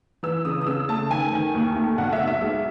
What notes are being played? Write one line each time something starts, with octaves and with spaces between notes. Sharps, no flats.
E3 E6
C#3 D#6
D#6
C#3 E6
A3 A5
D#3 G#5
D#3
D#2
A3
B1 F#5
E5
B1
E5
G#3